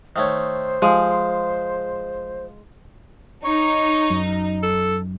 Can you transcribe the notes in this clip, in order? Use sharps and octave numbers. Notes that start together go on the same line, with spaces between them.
D#3 A3 C5 C#5
F3 G#3
D#4 C#5
F#2
A4